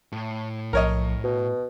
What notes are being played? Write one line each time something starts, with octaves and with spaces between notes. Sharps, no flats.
A2
B1 F3 A#4 C#5 D#5
B2 F#4